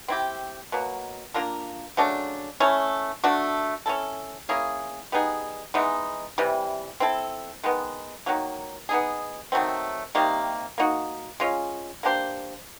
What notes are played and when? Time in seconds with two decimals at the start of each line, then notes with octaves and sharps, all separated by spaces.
0.08 C4 E4 G4
0.72 B2 F#3 A#3
1.34 A#3 D4 F4 A#4
1.97 C#3 F#3 A3 D4
2.60 A3 C#4 E4
3.24 A3 D4 F#4
3.86 C#4 E4 A4
4.49 A#3 C#4 E4 G#4
5.12 G3 B3 D#4 G#4
5.74 E3 G#3 B3 D#4
6.38 C3 E3 G3
7.00 C4 E4 A4
7.63 D#3 G#3 B3
8.26 D#3 F#3 A#3
8.89 B3 D#4 G#4
9.52 D#3 F#3 A3 C4
10.15 C3 D#3 G3 A#3
10.78 A#3 D#4 F#4
11.40 G#3 C#4 F4
12.03 A#3 D4 G4 C5